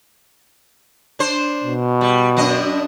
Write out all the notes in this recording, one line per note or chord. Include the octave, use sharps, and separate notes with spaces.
D4 C5
B2
G3
F#2 D4 D#5